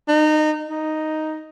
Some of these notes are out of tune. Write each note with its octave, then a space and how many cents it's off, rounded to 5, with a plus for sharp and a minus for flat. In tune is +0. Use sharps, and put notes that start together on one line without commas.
D#4 -25
D#4 +0